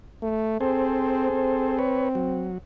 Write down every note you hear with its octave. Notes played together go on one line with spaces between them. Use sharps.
A3
C4 G#4 A4 C5
C4
B4 C#5
F#3